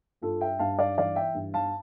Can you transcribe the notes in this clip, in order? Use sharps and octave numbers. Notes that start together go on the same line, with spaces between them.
G2 F4 A4
E5 G5
G2 F5 A5
D5 F5
E3 D5 F5
E5 G5
G2
F5 A5